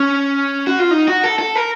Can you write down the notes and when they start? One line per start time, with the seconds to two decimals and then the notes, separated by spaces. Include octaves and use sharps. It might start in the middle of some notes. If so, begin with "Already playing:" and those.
Already playing: C#4
0.67 F#4
0.79 F4
0.91 D#4
1.08 F#4
1.24 A4
1.39 A4
1.55 A#4